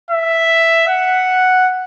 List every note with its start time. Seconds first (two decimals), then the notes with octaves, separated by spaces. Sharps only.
0.11 E5
0.88 F#5